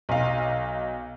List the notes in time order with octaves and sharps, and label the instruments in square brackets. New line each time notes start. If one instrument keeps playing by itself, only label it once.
[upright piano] B1 F5